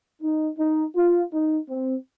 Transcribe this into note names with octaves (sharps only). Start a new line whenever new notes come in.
D#4
D#4
F4
D#4
C4